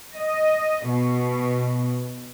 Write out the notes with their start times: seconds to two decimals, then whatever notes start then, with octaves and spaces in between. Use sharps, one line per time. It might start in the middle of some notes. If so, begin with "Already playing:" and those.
0.18 D#5
0.89 B2